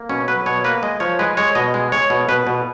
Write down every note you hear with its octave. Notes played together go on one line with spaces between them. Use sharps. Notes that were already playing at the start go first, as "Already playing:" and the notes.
Already playing: A#3
B2 C#4
F#3 B4
B2 C#5
A#3 B4
G#3 D#5
F3 C#5
G#3 B4
G#3 C#5
B2 D#5
G#3
G#3 C#5
B2
B2 B4
B2